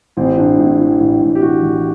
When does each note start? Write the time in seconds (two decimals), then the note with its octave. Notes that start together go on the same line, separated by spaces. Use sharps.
0.17 A1 C4
0.37 A2 D4
0.59 A2
0.79 E3
1.00 A1
1.21 A1
1.35 G4
1.41 E3 F#4
1.62 A1